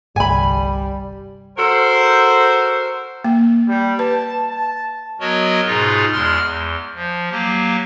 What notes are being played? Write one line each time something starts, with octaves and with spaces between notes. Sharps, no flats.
G1 C2 G3 G#5 B5
F#4 A4 A#4 C5
A#3
G3
B4 A5
A5
F#3 B3 F#4 A#4 C#5 D#5
G#2 B2 D#4 F4 G#4
E2 G#3 C6 F6
E2
F3
F#3 A#3 G4